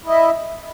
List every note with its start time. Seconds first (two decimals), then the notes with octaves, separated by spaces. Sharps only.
0.05 E4
0.07 D#5
0.10 E5